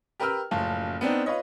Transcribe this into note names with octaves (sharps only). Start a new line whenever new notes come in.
G4 A#4 B4 G5 E6 F6
F#1 A2 F3 F4 A5
B3 C4 D4 D#4
F4 B4 C#5 D#5